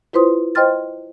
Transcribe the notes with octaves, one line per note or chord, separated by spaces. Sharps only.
E4 F4 B4 C5 C6 D#6
C5 D#5 G5 C6 F6 A6